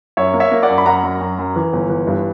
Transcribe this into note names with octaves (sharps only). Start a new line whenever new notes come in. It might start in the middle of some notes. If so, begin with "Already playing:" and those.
F#2 C#5 E5
A#3
C#5 E5
A#3
D5 F#5
F#2
B5
F#2 F#5 A#5
F#2
F#2
F#2
E3
G1
E3
G2